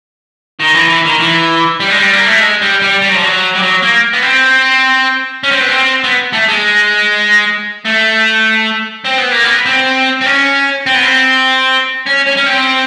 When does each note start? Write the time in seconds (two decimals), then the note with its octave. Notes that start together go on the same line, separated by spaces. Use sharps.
0.60 D#3
0.75 E3
0.90 E3
1.06 D#3
1.20 E3
1.80 G3
1.90 G#3
1.99 G3
2.13 A#3
2.27 A3
2.40 G#3
2.62 G3
2.82 G3
3.02 G3
3.09 F#3
3.15 F3
3.22 F#3
3.55 G3
3.61 F#3
3.82 A#3
4.13 B3
4.22 C4
5.43 C#4
5.51 C4
5.60 B3
5.68 C4
6.04 B3
6.33 A3
6.48 G#3
7.85 A3
9.04 C4
9.18 B3
9.32 A#3
9.44 B3
9.66 C4
10.21 C4
10.26 C#4
10.86 C4
10.95 B3
11.03 C4
12.07 C#4
12.27 C#4
12.37 C#4
12.47 C4